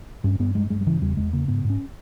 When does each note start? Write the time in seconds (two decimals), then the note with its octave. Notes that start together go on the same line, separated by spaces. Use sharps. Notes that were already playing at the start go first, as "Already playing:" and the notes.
0.24 G2 C#4
0.39 G2 B3
0.55 G2 G#3
0.70 G2 G#3
0.81 G3
0.86 C#3 E3
1.02 E2 G3
1.17 E2 G#3
1.33 C#3 A#3
1.48 G#2 B3
1.65 G#2
1.70 C#4